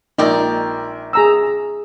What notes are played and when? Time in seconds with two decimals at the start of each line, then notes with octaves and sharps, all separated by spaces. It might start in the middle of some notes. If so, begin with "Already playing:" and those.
0.18 A#1 D#4 A#4 D5 G5
1.13 G#4 A#5 E6